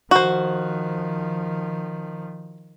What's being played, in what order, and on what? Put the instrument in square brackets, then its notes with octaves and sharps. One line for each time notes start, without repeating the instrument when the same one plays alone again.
[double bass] D#3 F3 [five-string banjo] F#4 C5